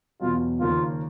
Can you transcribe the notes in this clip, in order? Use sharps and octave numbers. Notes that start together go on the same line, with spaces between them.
E2 B2 F#3 F4
D#2 C#3 F3 A#3 D4 F4